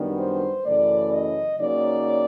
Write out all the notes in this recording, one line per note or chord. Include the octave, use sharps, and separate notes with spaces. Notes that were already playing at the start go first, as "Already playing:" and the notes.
Already playing: F#2 D#3 G3 B3 D4
C5
F#2 C#3 E3 A3 D5
D#5
C#3 F#3 A#3 D#4 D5